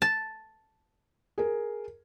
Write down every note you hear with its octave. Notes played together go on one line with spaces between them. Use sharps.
A5
G#4 A#4